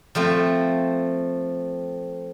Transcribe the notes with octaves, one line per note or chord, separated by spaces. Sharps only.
F3 A3 C4